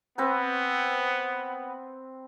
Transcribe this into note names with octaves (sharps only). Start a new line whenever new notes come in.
B3 C4 B4